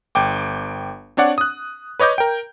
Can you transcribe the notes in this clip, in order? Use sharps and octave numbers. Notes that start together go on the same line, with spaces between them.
G1 G5 D6
C4 D4 C#5 D5 F#5
D#6 F#6
B4 C#5 D#5 D6 G6
A#4 G5